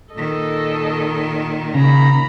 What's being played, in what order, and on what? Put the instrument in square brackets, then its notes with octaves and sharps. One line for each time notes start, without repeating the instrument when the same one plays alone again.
[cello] A#2 D#3 [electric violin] A4 D#5
[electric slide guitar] C#3 [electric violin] A#5 B5